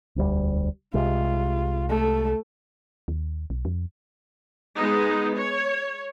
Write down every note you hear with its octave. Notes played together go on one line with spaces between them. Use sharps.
E1 D2 G3
C2 C3 G#3 F4
A3 A4
D#2
B1
F2
G#3 B3 D#4
C#5